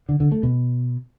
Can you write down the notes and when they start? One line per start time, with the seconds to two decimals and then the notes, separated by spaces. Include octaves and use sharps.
0.09 D3
0.20 D3
0.32 A3
0.43 B2